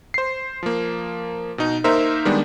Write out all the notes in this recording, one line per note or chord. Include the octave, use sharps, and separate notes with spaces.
C5 C7
F3 A#3
B2 D#4
A#3 D#4 A#4 C5 E5
D#3 G3 G#3 B3 D4